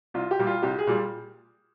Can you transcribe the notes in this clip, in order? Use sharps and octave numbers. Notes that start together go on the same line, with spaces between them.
C2 F4
G4
A#2 G3
F4
C2 G4
G#4
A#2 G3